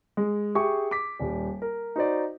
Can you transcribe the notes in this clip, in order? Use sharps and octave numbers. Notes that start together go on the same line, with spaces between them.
G#3
G4 G#4 E5 C#6
D6 B6
D#1 G3
A#4
D#4 F#4 C5 D5